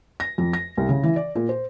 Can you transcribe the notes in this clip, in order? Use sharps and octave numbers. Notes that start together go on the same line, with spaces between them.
A#6
F2
A#6
C2
C#3
E3
D5
A#2
C5